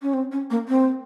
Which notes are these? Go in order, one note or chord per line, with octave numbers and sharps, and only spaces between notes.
C#4
C4
C#4
A#3
C4